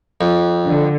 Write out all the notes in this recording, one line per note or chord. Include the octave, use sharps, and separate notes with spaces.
F2
D3